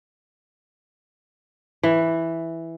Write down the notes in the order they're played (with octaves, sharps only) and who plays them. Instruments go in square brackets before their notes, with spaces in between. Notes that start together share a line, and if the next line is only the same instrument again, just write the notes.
[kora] E3